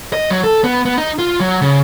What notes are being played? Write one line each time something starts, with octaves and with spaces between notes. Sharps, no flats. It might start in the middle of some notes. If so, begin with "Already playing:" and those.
D#5
F#3
A4
B3
B3
D#4
F4
F#3
C#3